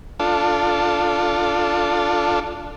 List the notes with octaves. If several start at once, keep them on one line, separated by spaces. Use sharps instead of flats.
D4 F4 A4